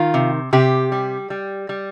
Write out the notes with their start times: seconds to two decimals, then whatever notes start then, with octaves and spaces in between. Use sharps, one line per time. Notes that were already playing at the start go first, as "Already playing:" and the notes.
Already playing: D#3 F4
0.14 C3
0.53 C3 G4
0.92 G3
1.30 G3
1.69 G3